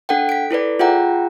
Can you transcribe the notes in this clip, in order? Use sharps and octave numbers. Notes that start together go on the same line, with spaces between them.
D4 A4 F#5 G5
B6 D7
E4 A4 B4 D5
F4 G#4 E5 F#5 G5 A#5